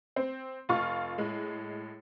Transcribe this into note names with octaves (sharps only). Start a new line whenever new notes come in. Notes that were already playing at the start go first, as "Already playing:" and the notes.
C4
F1 F4 C#6 F6
A2 G#3